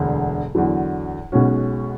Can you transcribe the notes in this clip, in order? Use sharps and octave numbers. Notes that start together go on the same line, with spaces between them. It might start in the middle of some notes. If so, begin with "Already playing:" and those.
Already playing: E1 D2 D3
E2 D3 F#3
B1 B2 G#3 C#4 F#4